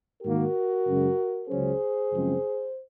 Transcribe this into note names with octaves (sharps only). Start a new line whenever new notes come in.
G#2 D#3 A#3 F#4 A#4
F#2 C#3 G#3
C#2 C#3 F#3 C#4 G#4 C5
F#2 C#3 F3 G#3 C4